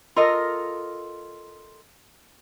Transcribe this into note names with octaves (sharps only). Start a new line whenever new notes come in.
F4 A4 A#4 D#5